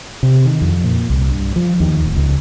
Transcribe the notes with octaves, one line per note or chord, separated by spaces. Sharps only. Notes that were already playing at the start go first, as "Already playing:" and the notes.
C3
D#3
F2
A#2
C2
G2
F3
D#2
D1
C#2